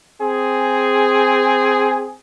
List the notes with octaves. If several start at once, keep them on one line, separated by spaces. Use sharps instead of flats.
C4 G#4